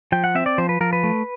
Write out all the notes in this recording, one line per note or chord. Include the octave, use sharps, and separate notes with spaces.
F3 G5
F#5
C4 E5
D5
F3 C5
B4
F3 A#4
B4
A3